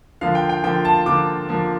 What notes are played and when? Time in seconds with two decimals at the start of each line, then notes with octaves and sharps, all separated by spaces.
0.21 D3 F3 A#3 F5
0.35 G5
0.49 G5
0.63 D3 F3 A#3 G5
0.85 A5
1.06 D3 F3 A#3 D6
1.49 D3 F3 A#3